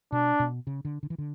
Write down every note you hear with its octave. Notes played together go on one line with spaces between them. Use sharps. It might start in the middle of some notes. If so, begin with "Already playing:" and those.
B2 D4
B2
C#3
D3
D3
E3
D3